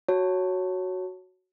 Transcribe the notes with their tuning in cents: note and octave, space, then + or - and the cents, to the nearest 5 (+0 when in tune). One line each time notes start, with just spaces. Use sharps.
F#4 +0 C#5 +0 A5 +15